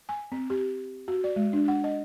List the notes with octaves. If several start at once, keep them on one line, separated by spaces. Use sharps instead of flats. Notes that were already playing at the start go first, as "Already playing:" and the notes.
G#5
C4
G4
F#4
D5
G#3
D4
F#5
D#5